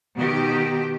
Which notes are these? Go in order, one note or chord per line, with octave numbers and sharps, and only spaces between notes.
B2 D#3 G4